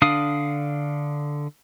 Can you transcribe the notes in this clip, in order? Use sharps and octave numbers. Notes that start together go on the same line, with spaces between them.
D3 D4 F5 D#6